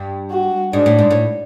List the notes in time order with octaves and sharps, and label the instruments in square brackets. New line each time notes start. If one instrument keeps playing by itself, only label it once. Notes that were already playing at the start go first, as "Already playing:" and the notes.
Already playing: [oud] G2
[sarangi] F#4
[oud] G#2 [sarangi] D4
[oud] A2
G#2
A2